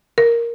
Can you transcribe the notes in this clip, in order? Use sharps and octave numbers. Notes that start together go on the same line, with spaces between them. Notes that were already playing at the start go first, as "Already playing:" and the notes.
A#4